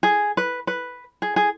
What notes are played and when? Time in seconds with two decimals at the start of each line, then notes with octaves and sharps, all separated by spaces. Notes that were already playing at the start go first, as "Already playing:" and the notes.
0.03 G#4
0.37 B4
0.67 B4
1.22 G#4
1.36 G#4